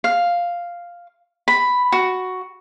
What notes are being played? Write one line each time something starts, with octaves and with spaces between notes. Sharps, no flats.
F5
B5
F#4